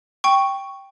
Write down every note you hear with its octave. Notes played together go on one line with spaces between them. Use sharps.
G5 C#6